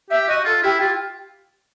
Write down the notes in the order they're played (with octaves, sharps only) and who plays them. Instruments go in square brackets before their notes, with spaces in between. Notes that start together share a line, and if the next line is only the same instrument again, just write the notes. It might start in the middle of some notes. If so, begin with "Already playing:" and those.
[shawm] G4 [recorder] E5
[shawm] F#4 [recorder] D#5
[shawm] F4 [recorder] A4
[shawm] E4 [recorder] G4
[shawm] F4 [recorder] G4